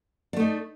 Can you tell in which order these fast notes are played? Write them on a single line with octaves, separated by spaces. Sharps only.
D4 A3 D#4